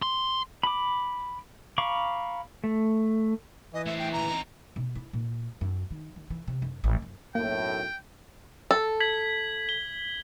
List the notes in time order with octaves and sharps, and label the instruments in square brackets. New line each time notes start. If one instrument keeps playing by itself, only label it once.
[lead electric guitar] C6
[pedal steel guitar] B5 D6
F5 A#5 B5 C#6 D6
A3
[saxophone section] E3 [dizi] D#5
[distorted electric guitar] A2 C5 [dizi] E5
[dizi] G5
[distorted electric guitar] D2 A#2 [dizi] A#5
[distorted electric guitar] C4 D#4
[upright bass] B2
E4
A#2
F#2
D#3
D#3
E3
C3
F#2
A1
F#2
[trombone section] B1 F#2 A2 [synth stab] A#3 [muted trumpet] G5
[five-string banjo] A4
[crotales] G#6 B6 F#7
G7